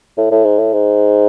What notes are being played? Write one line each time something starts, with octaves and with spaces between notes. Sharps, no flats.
A2
A2
G#2
A2
G#2